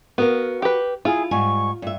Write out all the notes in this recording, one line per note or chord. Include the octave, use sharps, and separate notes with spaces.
B3 F#4 A#4 F5
G4 B4
E4 F4 G#4
G#2 G3 G#5 C#6
G2 E5